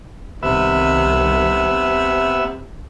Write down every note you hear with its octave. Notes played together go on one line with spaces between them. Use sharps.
C2 C3 D#3 B3 E5